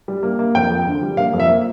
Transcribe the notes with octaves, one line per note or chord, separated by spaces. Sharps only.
G3
A#3
A#3
F2 G5
F2
D3
G3
A#3 F5
F2
E5
A#3